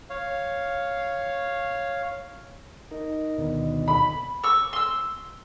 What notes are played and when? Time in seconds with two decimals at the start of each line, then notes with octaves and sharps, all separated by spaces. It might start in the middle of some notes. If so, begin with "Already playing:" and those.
0.10 C#5 F5
2.91 D#4 A#4
3.38 D2 B2 D#3
3.88 B5
4.44 C#6 E6
4.73 C6 E6